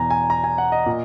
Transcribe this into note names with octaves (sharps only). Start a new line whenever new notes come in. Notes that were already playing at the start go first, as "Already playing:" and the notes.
Already playing: E2 B2 G#5 A#5
G#5
A#5
G#5
F#5
D#5
A#2